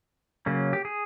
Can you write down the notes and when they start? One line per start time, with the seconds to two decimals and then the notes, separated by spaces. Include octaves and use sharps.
0.46 C#3 F#3 A#3 C#4
0.73 G4
0.85 G#4